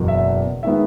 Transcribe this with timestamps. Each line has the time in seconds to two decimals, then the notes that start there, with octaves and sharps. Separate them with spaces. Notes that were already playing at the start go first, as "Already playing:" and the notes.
Already playing: F#1 E2 B2
0.08 E5
0.63 D#3 G#3 B3 E5